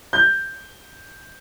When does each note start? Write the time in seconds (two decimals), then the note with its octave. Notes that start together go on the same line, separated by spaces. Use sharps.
0.13 G6